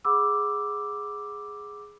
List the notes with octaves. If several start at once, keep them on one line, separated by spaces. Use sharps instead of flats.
G#4 F#5 B5 D6 E6